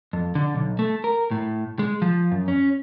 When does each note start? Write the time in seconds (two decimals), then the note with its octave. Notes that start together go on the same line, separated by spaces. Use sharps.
0.13 F2
0.35 D3
0.54 B1
0.79 A3
1.04 A#4
1.31 A2
1.79 G#3
2.02 F3
2.32 F#2
2.48 C#4